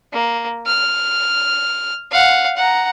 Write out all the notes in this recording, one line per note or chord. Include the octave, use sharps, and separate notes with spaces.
A#3
F6
F5 F#5
F#5 A#5